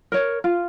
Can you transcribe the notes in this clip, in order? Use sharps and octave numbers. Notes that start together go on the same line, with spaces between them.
A#4 C#5
F4